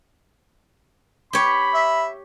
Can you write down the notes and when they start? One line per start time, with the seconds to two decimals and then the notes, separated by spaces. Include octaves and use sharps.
1.33 G4 C#5 B5
1.74 E5